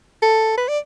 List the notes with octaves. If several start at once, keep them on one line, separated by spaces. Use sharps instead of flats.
A4
B4
D5